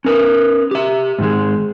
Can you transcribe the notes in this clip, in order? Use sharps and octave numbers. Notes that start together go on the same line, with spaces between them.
C#4 A#4 B4
G4 E5
G#2 D#3 G#3